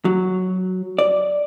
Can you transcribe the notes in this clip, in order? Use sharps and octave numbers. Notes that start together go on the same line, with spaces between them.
F#3
D5